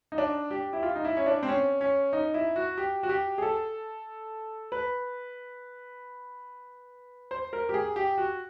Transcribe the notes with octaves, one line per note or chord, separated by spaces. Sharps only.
D#4
D4
G4
E4
F4
D#4
E4
C#4
D4
C4
C#4
C#4
D#4
E4
F#4
G4
F#4
G4
G#4
A4
B4
C5
A#4
G4
G#4
G4
F#4